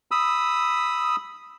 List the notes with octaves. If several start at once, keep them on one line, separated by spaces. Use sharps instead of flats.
B5 D#6 E6